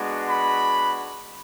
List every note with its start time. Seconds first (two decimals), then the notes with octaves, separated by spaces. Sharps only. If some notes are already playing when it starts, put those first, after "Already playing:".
Already playing: G#3 B3 D4 F#4
0.30 B5